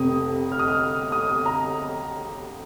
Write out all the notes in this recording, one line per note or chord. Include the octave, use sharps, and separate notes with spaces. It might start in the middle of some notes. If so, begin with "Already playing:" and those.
Already playing: F1 F2 C3 D#6
F6
D#6
F6
D#6
D#6
A#5